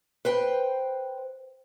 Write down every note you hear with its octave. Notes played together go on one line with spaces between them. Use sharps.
B4 C5 G5